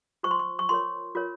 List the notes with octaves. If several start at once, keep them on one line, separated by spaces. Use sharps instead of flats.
F4 C5 C#6
C6
C#6
C#6
F4 A#4 C#5 C6
F4 A#4 C#5